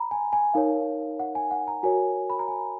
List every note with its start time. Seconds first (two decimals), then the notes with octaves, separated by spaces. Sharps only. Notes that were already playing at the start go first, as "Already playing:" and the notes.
Already playing: A#5 B5
0.11 G#5
0.33 G#5
0.54 D#4 A#4 C#5 F5
1.19 F#5
1.35 G#5
1.51 F#5
1.68 A#5
1.83 F#4 A#4 C#5 G#5
2.30 B5
2.39 A#5
2.48 G#5